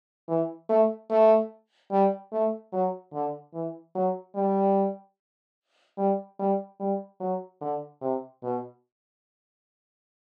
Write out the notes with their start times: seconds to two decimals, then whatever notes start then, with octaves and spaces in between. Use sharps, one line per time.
0.28 E3
0.69 A3
1.10 A3
1.91 G3
2.32 A3
2.73 F#3
3.13 D3
3.54 E3
3.95 F#3
4.35 G3
5.98 G3
6.39 G3
6.80 G3
7.20 F#3
7.61 D3
8.01 C3
8.43 B2